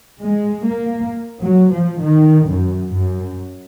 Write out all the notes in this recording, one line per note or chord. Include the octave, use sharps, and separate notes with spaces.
G#3
A#3
F#3
F3
D#3
F#2
F#2